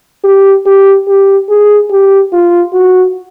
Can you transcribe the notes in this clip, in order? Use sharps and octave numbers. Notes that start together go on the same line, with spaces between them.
G4
G4
G4
G#4
G4
F4
F#4